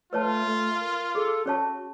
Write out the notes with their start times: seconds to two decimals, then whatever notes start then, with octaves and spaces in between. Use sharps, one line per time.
0.13 A3 F4 B4 C#5 A5
0.46 A3
0.81 A#4
1.15 G#4 A4
1.46 C#4 F#4 C#5 A5